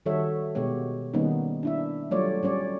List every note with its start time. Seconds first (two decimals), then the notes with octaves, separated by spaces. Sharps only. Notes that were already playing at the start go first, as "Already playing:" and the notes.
0.06 D#3 G3 F#4 A4 C#5 E5
0.55 B2 G#3 B3 G4 C#5
1.14 D#3 G3 A#3 B3 C#4 D#4
1.63 D4 E4 E5
2.11 F#3 G3 A3 F4 C#5 D5
2.43 G3 C#4 C#5 D5